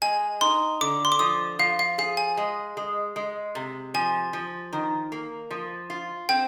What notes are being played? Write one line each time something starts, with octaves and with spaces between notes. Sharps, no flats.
G#3 G#5
D#4 C6
D3 D6
C6
D6
F3 D#6
F3 F5
F5
G#4 F5
G#5
G#3
G#3
G#3
C3
F3 G#5
F3
D#3
A#3
F3
F4
C4 G5